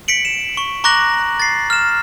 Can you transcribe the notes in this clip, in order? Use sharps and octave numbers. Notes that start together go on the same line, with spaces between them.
B6 C#7 D7 F#7
E7
C#6
A#5 C#6 D6 F#6 A#6 F#7
A6 C7
F6 E7